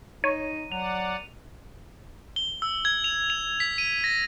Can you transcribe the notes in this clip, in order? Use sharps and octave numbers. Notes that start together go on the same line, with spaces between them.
D#4 C#5 D#7
F#3 D5 F#5 F7
G7
E6
G#6
F7
F7
B6
D#7
A#6